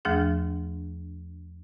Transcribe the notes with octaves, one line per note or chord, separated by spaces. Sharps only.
E2 F3 A3 D4 G#4 F#5